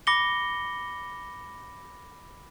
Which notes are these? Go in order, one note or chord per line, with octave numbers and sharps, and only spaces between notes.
B5 D6 A#6 C#7 G7